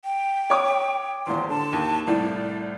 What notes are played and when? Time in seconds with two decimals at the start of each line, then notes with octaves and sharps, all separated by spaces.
0.04 G5
0.50 C#5 D6 D#6
1.27 D#1 E2 C6
1.49 D3 A5
1.72 D#2
2.07 C2 A2 D5